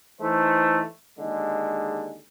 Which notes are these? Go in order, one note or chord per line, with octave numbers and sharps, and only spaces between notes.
E3 A3 D#4 C5
D#2 D3 G#3